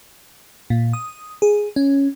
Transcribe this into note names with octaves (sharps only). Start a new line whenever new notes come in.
A#2
D#6
G#4
C#4